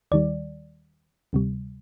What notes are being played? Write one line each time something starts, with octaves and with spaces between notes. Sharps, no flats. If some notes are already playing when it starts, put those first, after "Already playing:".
D#2 D#3 G3 D5
D2 C3 G3